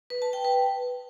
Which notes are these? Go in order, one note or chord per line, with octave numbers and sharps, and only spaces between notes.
B4
A5
G5
B4